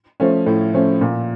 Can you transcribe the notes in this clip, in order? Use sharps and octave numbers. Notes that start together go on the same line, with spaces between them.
F3 A3 C#4
A2
F3 A3 C#4
A#2